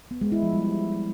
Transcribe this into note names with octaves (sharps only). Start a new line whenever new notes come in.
B3
G#3
E4
F3
G3